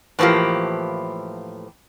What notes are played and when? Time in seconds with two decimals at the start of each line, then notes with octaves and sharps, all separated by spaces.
0.19 A2 E3 F3 A#3 G4